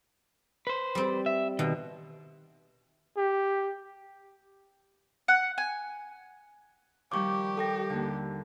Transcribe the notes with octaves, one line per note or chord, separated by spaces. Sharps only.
B4 C5
G3 C4
E5
B2 D#3
G4
F#5
G#5
D#3 F3 G3 G4 C#6 D6
A4 G5 A#6
D#2 D3